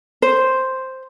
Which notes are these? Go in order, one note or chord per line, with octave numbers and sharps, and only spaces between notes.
C5